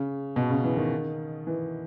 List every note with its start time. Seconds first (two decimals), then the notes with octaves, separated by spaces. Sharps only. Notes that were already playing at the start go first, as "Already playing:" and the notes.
Already playing: C#3
0.36 B2
0.50 C#3
0.64 E3
0.77 D#3
1.47 E3